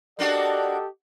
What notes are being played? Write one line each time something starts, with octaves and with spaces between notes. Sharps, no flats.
A#3 D4 F#4 G4 A4 D5 D#5